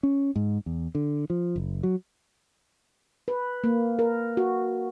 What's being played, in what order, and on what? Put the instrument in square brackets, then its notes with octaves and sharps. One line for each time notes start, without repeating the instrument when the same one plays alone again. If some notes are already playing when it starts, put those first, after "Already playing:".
[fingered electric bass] C#4
G#2
E2
D3
F3
F#1
F#3
[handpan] B4
A#3
A#4
F#4